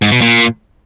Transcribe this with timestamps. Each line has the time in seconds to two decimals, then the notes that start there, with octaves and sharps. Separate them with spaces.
0.02 G#2
0.12 B2
0.21 A#2